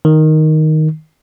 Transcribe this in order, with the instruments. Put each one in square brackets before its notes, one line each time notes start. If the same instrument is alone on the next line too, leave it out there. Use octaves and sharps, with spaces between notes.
[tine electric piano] D#3